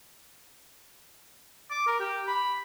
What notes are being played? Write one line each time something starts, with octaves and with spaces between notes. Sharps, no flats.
D6
A#4
G4
B5